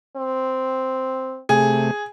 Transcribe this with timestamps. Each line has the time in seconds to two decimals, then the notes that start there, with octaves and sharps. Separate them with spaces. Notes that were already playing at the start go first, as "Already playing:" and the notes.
0.16 C4
1.49 C3 A3 G#4